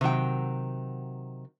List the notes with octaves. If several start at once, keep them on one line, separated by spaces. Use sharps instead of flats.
C3 D#3 F#3 G5